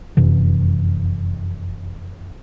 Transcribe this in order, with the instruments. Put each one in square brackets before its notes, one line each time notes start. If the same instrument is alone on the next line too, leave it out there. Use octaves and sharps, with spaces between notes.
[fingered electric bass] F1 F#2 C3 E3